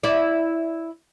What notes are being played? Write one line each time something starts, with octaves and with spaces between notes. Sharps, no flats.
E4 D5